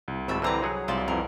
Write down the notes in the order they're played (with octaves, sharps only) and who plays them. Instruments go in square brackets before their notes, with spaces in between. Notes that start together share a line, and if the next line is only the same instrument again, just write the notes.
[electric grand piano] C2
[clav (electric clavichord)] G#1 A5 [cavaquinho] C#5 E5 B5
[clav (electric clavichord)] D3 E3 C4 [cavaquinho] B4 A#5 C6
[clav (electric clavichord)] F#3 G#4 F#5
[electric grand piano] C2 [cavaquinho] F4 C5 D5
[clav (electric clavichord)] F2 E3 [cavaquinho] A#4